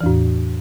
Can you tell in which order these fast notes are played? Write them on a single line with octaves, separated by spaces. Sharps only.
E3 E2 A2